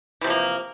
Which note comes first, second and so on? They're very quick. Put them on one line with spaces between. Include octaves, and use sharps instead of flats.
E3 C3 F3 A#3